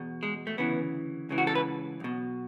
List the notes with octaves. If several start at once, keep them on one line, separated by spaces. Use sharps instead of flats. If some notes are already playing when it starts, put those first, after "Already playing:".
Already playing: E2 B2
G#3
A3
D2 C#3 E3 B3
C#2 C#3 E3
F#4
A4
B4
B1 B2